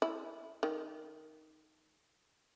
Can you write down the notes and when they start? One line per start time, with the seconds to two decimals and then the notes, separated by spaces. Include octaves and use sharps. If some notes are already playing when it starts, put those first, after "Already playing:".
0.02 E4
0.63 D#3